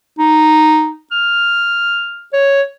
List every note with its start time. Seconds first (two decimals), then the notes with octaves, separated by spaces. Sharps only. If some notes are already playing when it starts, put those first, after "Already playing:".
0.19 D#4
1.12 F6
2.33 C#5